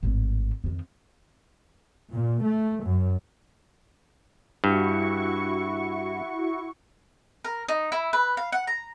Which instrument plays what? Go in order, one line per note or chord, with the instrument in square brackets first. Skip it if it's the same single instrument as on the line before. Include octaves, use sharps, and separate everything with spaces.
[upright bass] G#1 A2
F2 D#3
[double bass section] A#2
A3
F#2
[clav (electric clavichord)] G2 [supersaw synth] E4 F#4 C#6
[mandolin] A#4
D#4
E4
B4
F5
F#5
A#5